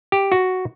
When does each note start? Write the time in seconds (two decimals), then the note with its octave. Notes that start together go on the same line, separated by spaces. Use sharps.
0.12 G4
0.32 F#4